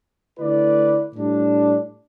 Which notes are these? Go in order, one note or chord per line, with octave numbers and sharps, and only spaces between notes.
D3 A3 E4 B4 D5
A2 G3 D4